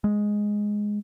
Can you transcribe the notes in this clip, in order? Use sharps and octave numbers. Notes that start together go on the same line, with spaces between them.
G#3